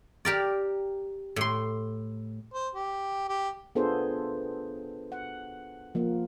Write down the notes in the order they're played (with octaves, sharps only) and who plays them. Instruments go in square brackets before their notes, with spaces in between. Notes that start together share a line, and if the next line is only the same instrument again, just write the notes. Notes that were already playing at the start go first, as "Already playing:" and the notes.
[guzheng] G4 A#4 D5
A2 C6
[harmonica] C5
G4
G4
[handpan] B3 D4 F4 G#4 A4 C5
F#5
F3 A#3